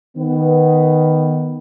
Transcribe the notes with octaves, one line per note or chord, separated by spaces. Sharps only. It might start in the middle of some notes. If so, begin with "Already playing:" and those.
D#3 B3